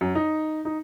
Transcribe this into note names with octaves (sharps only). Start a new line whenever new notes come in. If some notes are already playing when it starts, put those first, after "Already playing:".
F#2
D#4
D#4